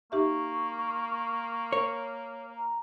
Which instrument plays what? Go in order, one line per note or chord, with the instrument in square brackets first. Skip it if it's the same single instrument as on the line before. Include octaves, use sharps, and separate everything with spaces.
[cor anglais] A#3 [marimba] D#4 G4 E5 [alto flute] C#6
[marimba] A#4 [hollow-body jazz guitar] C#5
[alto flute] A#5